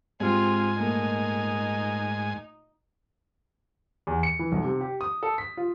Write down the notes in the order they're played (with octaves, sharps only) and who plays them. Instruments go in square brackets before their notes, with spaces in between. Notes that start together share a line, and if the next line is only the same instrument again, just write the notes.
[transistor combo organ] G#2 G#5 [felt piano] G#3 C4 G4 [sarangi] F4
[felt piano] A#2 A3 A#3 [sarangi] D#4
[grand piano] E2
C#7
E3
B1
C3
G4
D#6
A4
B6
F4